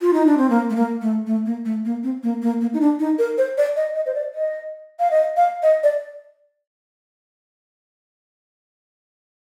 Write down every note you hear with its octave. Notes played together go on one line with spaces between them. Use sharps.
F4
D#4
D4
C4
A#3
A3
A#3
A3
A3
A#3
A3
A#3
C4
A#3
A#3
A#3
D#4
D4
D#4
A#4
C5
D5
D#5
D#5
C5
D5
D#5
F5
D#5
F5
D#5
D5